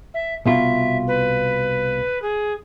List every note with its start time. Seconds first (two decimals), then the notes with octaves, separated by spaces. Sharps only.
0.14 E5
0.46 C2 B2 F4 E5
1.07 B4
2.22 G#4